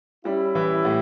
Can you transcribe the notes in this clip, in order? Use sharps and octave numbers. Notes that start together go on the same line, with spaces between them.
G3 C#4 E4
E3
A2